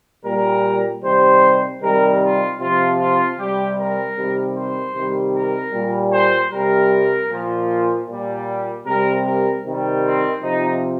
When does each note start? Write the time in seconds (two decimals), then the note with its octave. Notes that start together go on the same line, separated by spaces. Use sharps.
0.25 A#2 G3 A#4
1.04 C3 D#3 G3 C5
1.82 C3 D#3 G3 A#4
2.21 F4
2.60 C3 F3 F4
2.99 F4
3.38 C3 G3 G4
3.78 A#4
4.16 C3 D#3 G3
4.56 C5
4.95 C3 D#3 G3
5.34 A#4
5.73 A#2 G3
6.13 C5
6.52 C3 G3 A#4
7.30 A#2 F3
8.08 A#2 G3
8.86 C3 G3 A#4
9.25 A#4
9.65 C3 D#3 G3
10.04 C4
10.43 C3 F3 D#4